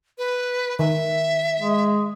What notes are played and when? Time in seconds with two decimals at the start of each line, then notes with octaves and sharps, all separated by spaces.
0.18 B4
0.79 D#3 E5
1.60 G#3